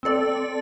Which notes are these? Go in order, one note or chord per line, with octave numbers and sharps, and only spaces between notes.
C4 A4 D5